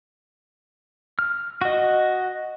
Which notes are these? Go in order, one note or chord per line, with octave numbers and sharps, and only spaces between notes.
F6
F#4 D#5